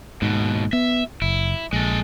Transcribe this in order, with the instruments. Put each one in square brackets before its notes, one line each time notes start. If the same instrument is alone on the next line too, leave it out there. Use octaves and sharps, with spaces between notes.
[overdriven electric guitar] D#2 B2 [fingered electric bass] G#2
[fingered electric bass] B3 [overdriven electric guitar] E5
[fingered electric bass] F#1 [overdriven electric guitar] E4
[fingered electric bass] A#1 [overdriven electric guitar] G#3 A4